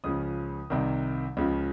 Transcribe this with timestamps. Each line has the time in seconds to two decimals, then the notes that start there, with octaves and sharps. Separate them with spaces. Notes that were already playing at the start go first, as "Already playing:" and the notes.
0.04 C#2 C#3 F3 D#6
0.70 C2 C3 D#3
1.37 C#2 C#3 F3